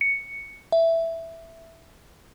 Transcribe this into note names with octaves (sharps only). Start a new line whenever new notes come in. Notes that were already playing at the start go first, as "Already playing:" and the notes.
C#7
E5